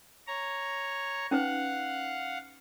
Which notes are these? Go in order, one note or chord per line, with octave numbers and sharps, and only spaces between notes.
C#5 A#5
C#4 D#4 B4 F5 F#5